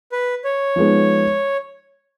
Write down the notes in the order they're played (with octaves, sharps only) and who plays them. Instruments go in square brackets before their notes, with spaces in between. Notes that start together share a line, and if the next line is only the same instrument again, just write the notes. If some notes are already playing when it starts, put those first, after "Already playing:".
[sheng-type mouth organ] B4
C#5
[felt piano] F3 G#3 B3 D#4